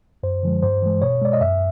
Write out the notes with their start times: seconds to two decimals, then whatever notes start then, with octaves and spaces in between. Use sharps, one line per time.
0.23 F#2 C5
0.43 D3 F3 G#3
0.63 G2 C5
0.82 E3 G#3
1.02 B2 C#5
1.21 G#3 D5
1.33 D#5
1.41 F#2 E5